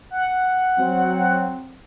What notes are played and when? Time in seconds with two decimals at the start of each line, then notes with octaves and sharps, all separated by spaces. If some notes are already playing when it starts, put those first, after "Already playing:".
0.10 F#5
0.79 F#3 C4